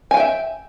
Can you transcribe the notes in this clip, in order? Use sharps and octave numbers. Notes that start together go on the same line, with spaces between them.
E5 F5 G5 G#5